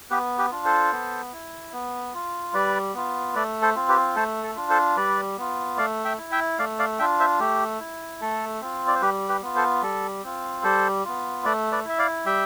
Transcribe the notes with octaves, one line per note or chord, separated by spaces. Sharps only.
B3 G4 B4
G4 B4
D4 F4
A4 C5
B3
E4
B3
F4
G3 B4 D5
B3 F4
A3 B4 D5
A4 C5
C4 F4
G4 B4
A3 A4 C5
A4
D4 F4
A4 C5
G3 B4 D5
B3 F4
A3 D5 F5
E5 G5
E4
E5 G5
A3 D5 F5
D5 F5
D4 F4 E5 G5
C5 E5
A3 G4
E4
A3 A4
C4 F4
D5
C5
G3 G4 B4
G4 B4
B3 F4
A4 C5
G3 A4
C4 F4
G3 A4 C5
B3 F4
A3 B4 D5
B4 D5
E4 E5
D5 F5
G3 E5 G5